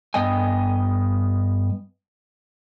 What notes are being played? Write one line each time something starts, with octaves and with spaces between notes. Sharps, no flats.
G2 B3 D#5 G5 G#5